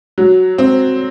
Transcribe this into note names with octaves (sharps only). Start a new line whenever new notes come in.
F#3
C4